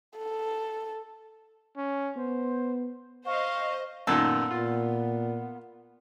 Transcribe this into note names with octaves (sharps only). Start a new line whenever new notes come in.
A4
C#4
B3 C5
C5 D#5 F5 C#6
F#2 A#2 D#3 B3 A4
A#2 F4